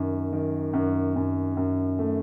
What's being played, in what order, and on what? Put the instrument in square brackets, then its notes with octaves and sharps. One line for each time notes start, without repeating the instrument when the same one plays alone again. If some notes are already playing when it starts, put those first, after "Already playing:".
Already playing: [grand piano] F#2 D#3
D#3
F#2
F#2
F#2
A3